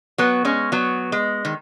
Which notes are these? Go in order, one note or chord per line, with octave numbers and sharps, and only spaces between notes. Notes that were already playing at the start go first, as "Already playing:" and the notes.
F#3 B3
G#3 C#4
F#3 B3
G#3
D#3